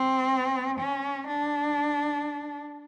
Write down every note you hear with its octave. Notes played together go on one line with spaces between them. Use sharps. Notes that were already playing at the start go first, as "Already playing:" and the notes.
Already playing: C4
C#4
D4